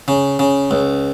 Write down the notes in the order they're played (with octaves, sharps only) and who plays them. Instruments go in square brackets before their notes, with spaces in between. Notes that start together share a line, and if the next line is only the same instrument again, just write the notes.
[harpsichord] C#3
C#3
C#2